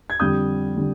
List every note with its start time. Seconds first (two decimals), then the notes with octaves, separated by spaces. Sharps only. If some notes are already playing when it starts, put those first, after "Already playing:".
0.10 G#6
0.20 F2 D3 G3 D#6 G6
0.77 D3 G3